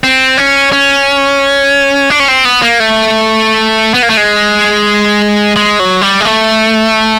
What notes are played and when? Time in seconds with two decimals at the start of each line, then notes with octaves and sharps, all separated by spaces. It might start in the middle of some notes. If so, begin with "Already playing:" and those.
0.04 C4
0.37 C#4
0.72 C#4
2.10 D4
2.20 C#4
2.28 C4
2.45 B3
2.62 A#3
2.80 A3
3.94 B3
4.03 A#3
4.10 A3
4.17 G#3
5.56 G#3
5.80 F#3
6.01 G3
6.20 G#3
6.25 A3